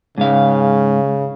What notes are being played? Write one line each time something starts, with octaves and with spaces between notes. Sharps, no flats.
G#2 C#3 F5